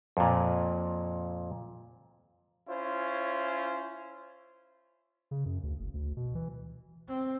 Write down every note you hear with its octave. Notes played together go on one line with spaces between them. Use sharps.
F2 A#2
C#4 E4 F4 C5
C#3
F#2
D2
F#1
D2
B2
E3
C4